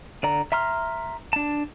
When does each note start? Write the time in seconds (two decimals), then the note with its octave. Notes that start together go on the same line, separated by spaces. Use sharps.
0.23 D3 D5 A#5
0.52 E5 A#5 C6 F6
1.33 D4 A5